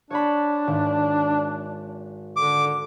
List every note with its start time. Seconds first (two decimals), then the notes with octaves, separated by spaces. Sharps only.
0.10 D4 C#5 D5 B5
0.67 G#1
2.36 D3 D6